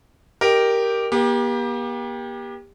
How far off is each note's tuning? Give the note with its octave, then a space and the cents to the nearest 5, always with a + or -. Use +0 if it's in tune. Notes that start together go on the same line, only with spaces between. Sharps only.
G4 +0 A#4 +0 D#5 +0
A#3 +40 G4 +20